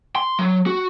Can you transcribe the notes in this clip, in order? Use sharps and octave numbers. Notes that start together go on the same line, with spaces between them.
C6
F#3
F#4